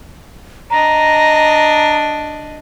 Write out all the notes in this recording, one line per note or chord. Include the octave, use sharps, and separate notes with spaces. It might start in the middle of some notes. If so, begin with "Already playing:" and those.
D4 D#5 A#5